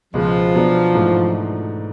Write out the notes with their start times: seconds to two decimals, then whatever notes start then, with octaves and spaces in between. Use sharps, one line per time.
0.14 C#2 B2 F3 G#3
0.54 B2 F#3 B3 D4
0.94 G#2 E3 A3 D4